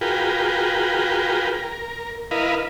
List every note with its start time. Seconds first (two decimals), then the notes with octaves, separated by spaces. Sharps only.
0.01 F4 F#4 G#4 A#4 B4 G5
1.53 A#4
2.31 E4 A#4 B4 D#5 F5